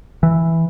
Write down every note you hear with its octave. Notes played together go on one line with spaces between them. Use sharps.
E3